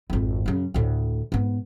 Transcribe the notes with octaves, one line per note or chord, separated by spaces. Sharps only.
G#1 F2
F#2 C#3
D2 A2
G#2 B3